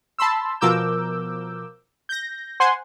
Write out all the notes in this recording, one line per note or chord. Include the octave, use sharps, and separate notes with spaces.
A5 B5 C6 E6
B2 F3 A#4 D6 E6 G6
G6 A#6
C5 F#5 G#5 C6